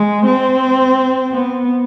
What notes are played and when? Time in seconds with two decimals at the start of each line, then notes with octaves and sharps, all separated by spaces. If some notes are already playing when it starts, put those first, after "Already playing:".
Already playing: G#3
0.26 C4
1.32 B3